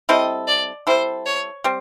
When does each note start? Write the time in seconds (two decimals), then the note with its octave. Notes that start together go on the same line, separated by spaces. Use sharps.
0.09 G3 C4 E4 A4 D#5
0.47 D5
0.87 G3 C4 E4 A4 C5
1.26 C#5
1.64 G3 C4